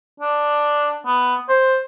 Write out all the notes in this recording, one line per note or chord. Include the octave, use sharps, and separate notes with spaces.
D4
B3
C5